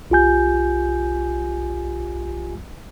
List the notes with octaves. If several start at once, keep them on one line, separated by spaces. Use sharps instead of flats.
B1 F4 G4 G#5 G6